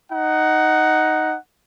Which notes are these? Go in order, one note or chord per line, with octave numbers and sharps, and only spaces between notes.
D#4 F#5